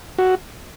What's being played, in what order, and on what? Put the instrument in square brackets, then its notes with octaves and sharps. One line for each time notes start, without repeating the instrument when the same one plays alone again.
[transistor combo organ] F#4